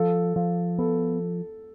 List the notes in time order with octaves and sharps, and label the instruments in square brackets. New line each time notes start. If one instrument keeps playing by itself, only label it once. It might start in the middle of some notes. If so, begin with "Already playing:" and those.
Already playing: [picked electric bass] F3 [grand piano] A4
[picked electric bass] F3
[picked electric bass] B3 [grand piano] A4